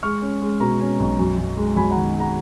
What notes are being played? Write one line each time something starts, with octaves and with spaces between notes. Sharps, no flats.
G#3 C#6 F6
C#4
G#3
B2 A#5 C#6
C#4
B1
F#2
F#2
G#3
F#2 G#5 B5
F#5 A#5
D#3
G#3 F#5 A#5